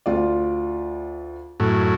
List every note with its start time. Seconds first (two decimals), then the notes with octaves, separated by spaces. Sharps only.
0.06 D2 F4 D5
1.60 F#2 A2